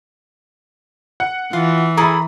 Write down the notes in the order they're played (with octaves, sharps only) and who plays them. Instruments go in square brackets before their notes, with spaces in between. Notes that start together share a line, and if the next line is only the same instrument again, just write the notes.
[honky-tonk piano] F#5
[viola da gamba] E3 [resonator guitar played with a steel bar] F4
[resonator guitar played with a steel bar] E4 G#4 A4 [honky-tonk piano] A#5 B5